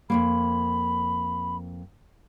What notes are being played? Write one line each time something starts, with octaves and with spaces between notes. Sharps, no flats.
F2 G#2 A#3 B5